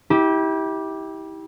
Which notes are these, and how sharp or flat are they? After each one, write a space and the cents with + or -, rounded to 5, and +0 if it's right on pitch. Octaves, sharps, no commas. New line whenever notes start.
E4 -35 G4 +0